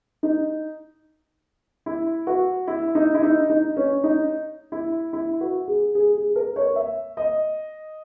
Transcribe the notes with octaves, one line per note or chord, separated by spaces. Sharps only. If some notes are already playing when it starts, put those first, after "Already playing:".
D#4
E4
F#4
E4
D#4
E4
D#4
D#4
C#4
D#4
E4
E4
F#4
G#4
G#4
G#4
A#4
C#5
E5
D#5